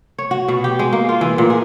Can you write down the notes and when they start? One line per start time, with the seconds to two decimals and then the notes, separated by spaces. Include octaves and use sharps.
0.19 C#5
0.31 F#4
0.48 B2
0.64 G4
0.79 G#3
0.92 A#3
1.09 F4
1.21 E3
1.38 A#2
1.50 G#4